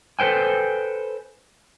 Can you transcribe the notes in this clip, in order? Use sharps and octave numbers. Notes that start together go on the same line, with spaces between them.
A4 B4 C5 G5 G#5